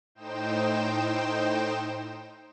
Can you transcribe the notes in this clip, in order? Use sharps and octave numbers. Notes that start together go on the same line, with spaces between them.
A2 D#4 C5 G5 E7